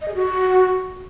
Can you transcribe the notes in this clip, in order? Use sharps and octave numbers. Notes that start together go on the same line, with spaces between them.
D#5
G#4
F#4